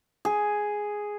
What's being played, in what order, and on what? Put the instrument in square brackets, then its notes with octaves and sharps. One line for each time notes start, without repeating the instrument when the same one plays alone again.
[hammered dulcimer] G#4